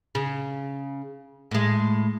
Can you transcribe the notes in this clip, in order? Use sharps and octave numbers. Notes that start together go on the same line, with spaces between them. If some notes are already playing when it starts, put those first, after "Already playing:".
C#3
A2 G#3